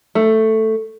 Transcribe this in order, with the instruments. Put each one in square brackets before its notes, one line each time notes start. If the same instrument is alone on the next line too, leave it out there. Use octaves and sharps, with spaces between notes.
[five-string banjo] A3